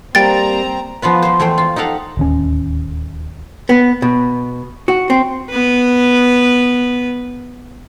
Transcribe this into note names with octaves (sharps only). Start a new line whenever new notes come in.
G3 A#3 C4 G5 A#5 A6
F3 B3 F4 B4
F3 C5
E2 A3 C5 G5
F4
D#4 G4 A4 F5 F#5
D1 D#2 C#4
B3
B2
F#4
C4
B3 B4